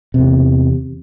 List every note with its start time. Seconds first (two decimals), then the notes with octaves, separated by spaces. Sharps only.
0.14 E2 C3